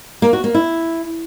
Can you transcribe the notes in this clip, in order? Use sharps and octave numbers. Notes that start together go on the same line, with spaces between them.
A#3
F#4
A#3
E4